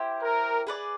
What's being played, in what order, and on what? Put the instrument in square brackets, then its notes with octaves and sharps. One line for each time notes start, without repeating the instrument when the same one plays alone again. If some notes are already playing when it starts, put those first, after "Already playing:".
Already playing: [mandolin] E4 G4 C5
[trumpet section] A#4
[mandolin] G#4 B4 D5